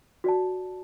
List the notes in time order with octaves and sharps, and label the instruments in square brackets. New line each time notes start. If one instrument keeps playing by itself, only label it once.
[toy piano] F#4 D5 A5